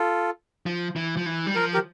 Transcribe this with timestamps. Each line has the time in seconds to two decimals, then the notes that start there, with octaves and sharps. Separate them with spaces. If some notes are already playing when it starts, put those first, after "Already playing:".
Already playing: F4 A4
0.66 F3
0.96 E3
1.17 F3
1.26 E3
1.47 G3
1.56 F3 A#4
1.74 G4 A#4